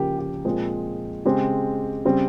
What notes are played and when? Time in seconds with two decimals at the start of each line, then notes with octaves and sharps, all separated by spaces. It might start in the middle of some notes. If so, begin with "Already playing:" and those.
Already playing: C#3 F3 A#3 G4
0.19 G4
0.45 A#2 F3 G#3 C4
1.25 C#3 G#3 C4 G4
2.05 C#3 G3 C4